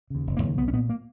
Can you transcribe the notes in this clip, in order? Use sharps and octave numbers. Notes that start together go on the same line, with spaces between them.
D#2 C#3
F1
A#3
D#2 C#3
B1 B3
C#4
A#2 B3
A#3